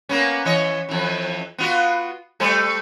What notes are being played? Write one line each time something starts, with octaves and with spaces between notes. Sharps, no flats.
A#3 B3 C#4
E3 C#5 D#5
F2 E3
B3 F4 F#4
G3 A3 C5